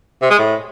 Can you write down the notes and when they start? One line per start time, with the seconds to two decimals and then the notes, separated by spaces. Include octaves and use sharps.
0.22 C3
0.30 G#3
0.39 A2